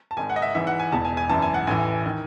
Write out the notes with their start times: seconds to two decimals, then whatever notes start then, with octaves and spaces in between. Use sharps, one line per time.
0.11 A5
0.17 G#1 G#2 D#3 G#5
0.30 F#5
0.36 D#5
0.42 E5
0.55 G#1 G#2 E3 E5
0.67 F#5
0.80 G#5
0.92 E1 E2 B2 A5
1.05 G#5
1.17 G#5
1.29 G#1 F#2 E3 A5
1.42 G#5
1.54 F#5
1.67 A1 A2 E3 G#5
2.06 D#3